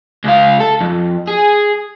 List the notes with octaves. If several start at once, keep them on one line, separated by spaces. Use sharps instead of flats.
C#2 F5
A4
F2
G#4